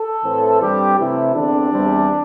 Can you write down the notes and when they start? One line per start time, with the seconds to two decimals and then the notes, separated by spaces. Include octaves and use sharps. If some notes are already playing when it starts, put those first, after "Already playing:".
Already playing: A4
0.25 A2 E3 C4
0.61 G2 G3 C4 G4
0.98 C3 E3 A3 E4
1.35 E2 D3 C4 D4
1.72 E2 E3 G3 C4